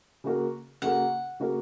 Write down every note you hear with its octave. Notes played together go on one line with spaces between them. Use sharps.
C#3 A#3 F#4 A#4
C#3 A#3 F#4 A#4 F#5
C#3 A#3 F#4 A#4